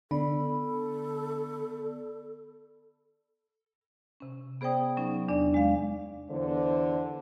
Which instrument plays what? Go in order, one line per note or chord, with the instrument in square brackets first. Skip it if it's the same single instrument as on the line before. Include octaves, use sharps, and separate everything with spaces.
[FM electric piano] D3 [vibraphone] B3 D5 [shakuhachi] A4 [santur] B5
[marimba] C3 C#4
B3 G#4 C5 D5 G5 D#6
F#3 C#4 D#4
E2 D4 D5
G#3 F5
[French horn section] E2 D3 C5